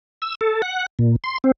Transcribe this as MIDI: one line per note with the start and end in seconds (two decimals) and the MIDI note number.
0.22 0.35 88
0.41 0.62 69
0.62 0.86 78
0.99 1.16 46
1.24 1.38 84
1.44 1.52 60